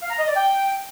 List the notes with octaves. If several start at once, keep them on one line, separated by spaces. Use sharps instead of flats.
F5
A#5
D#5
D5
G5